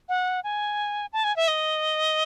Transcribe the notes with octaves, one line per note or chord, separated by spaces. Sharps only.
F#5
G#5
A5
G#5
E5
D#5